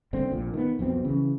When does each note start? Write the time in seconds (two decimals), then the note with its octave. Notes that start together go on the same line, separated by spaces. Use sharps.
0.13 F#1 C2 D3 C4
0.32 A#1 A#2
0.54 D#3 A3 B3
0.79 B1 F2 B2 C4
1.05 C#3 E3